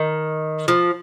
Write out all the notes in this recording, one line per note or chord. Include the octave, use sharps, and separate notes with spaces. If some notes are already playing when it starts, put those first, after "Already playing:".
Already playing: D#3
F3